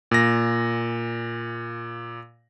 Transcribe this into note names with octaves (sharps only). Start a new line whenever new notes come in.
A#2 A#6